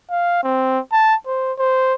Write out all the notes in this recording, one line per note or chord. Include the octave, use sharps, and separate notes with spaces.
F5
C4
A5
C5
C5